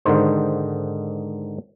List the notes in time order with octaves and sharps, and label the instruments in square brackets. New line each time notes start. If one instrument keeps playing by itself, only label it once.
[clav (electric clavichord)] G#2 D3 D#3 D#4 C5